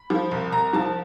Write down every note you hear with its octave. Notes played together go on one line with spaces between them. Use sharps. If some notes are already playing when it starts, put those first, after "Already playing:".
Already playing: B5
F3
C2
C2 A#5
F3 A5